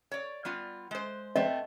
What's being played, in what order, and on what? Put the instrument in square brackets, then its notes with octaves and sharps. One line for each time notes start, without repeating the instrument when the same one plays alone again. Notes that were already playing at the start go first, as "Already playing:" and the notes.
[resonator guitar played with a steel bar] C#5 D5
G3 B3 F4
G#3 C5
[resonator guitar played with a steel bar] A3 B3 C4 [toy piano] D#5